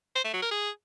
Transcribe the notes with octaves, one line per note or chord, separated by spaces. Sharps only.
C5
A3
F#3
A#4
G#4